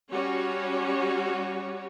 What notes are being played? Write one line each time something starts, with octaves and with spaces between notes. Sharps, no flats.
G3 C#4 F#4 C#5